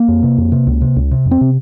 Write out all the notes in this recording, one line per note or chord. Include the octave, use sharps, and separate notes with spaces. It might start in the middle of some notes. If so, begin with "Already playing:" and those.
Already playing: A#3
F2
C3
F2
C3
C#2
C3
C#2
C3
F2
C4
C3